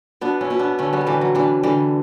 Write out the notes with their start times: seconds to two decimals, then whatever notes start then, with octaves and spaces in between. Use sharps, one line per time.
0.21 B2 B3 D4
0.41 C#4 E4
0.50 B2
0.59 B3 D4
0.79 D3 A3 C#4
0.93 G3 B3
1.01 A3
1.06 D3 E3 G3
1.21 F#3
1.35 E3 G3 D4
1.63 D3 E3 G3